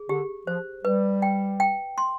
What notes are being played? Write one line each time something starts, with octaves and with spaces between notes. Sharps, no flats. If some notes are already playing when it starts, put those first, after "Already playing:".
Already playing: G#4
D3 G4
F3 C5
G3 B4
G5
G5
C6